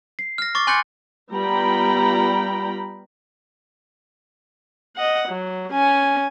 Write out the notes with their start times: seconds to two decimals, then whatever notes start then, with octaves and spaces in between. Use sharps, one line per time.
0.19 C7
0.38 F6 A#6
0.55 C#6 D6 A6
0.67 G#5 C6 F#6 G6 A6 C#7
1.32 G3 B3 F4 G5 A#5 B5
4.97 D#5 F#5
5.28 F#3
5.73 C#4 G#5